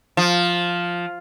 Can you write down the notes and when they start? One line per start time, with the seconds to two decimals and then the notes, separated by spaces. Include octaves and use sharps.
0.17 F3